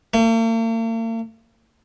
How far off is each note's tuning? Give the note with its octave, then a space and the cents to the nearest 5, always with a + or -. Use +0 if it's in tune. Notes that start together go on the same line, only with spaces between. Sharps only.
A#3 -45